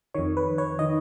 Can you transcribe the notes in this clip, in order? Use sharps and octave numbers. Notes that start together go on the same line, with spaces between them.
F2 D#3 C#5
B4
C#5
D#3 D#5